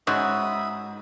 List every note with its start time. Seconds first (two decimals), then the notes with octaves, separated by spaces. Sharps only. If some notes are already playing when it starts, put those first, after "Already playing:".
0.07 G#2 G#3 C#4 F#4 E5 B5 D#6